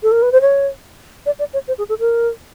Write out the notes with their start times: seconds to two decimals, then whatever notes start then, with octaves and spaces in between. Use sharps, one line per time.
0.03 A4
0.12 A#4
0.22 B4
0.32 C5
0.41 C#5
1.26 D5
1.39 D5
1.54 C#5
1.68 C5
1.78 G#4
1.89 A4
2.00 A#4